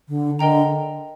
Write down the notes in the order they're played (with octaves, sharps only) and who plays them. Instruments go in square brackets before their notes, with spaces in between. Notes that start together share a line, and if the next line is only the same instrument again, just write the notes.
[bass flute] D3
[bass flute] D3 [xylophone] A#4 D#5 G5 A#5